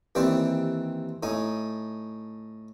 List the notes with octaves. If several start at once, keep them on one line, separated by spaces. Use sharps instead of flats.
D#2 E3 C4 G4 D5
A2 D#4 G#5